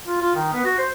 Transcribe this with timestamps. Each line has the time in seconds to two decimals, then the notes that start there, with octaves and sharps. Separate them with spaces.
0.06 F4
0.21 F4
0.35 D#3
0.53 B3
0.65 F#4
0.78 C5